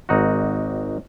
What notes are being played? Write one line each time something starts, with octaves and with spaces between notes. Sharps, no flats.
G#1 D#4 F#4